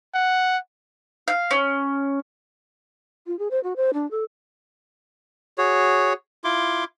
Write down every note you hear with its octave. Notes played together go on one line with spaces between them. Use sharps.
F#5
F5
C#4
F4
G#4
C5
F#4
C5
D4
A4
F#4 G#4 C#5
E4 F4 C6 D6